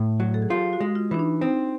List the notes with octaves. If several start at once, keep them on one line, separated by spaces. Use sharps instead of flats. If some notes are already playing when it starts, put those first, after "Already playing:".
Already playing: A2
F#3
A4
G#4
F4 G4
F#4
G#3
F4
E3 D4
D#4
C4 D#4